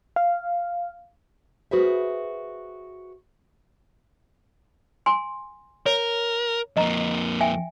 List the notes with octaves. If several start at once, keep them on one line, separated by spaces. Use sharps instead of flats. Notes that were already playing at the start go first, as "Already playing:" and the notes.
F5
F#4 G#4 B4 C5 E5
G#5 C6
A#4 C#5
F2 A#3 D#5 A#5
E5 G5 G#5